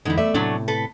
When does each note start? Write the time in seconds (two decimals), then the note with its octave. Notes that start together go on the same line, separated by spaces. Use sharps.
0.05 E2 D3 G#3 D#4 E4
0.18 A3 D5 E5
0.34 A2 C3 F#3 A3 D4
0.68 A4 B4